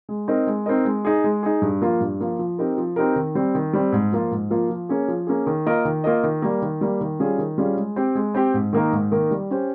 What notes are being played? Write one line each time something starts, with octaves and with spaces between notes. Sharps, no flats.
G#3
C4 D#4 A#4 D#5
G#3
C4 D#4 A#4 D#5
G#3
D#4 G#4
G#3
D#4 G#4
G2
F3 A#3 F4
G2
F3 A#3 F4
F3
C4 D#4 G4 A#4
F3
C4 D#4 G4 A#4
D#3
G3 C4
D#3
G3 C4
G#2
F3 A#3 F4
G#2
F3 A#3 F4
F3
A#3 C#4 G#4
F3
A#3 C#4 G#4
D#3
A#3 F4 A#4 D#5
D#3
A#3 F4 A#4 D#5
D#3
G3 A#3
D#3
G3 A#3
D#3
G3 C#4 F4 G#4
D#3
G3 C#4 F4 G#4
G#3
C4 G4
G#3
C4 G4
G#2
D#3 A#3 D#4 A#4
G#2
D#3 A#3 D#4 A#4
G3
C#4 G4 C5